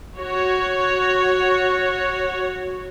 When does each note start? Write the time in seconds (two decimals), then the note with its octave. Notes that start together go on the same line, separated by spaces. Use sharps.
0.17 F#4 C#5